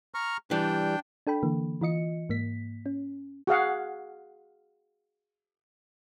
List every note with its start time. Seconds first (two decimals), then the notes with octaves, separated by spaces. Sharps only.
0.14 A#5 C#6 F6
0.51 E3 G3 D4 G5
1.27 D4 A4 G5 B5
1.43 D3 E3 A#3
1.81 E3 F4 D#5 C#7
2.29 G#2 A#3 B6
2.86 C#4
3.47 F#4 G#4 F5 F#5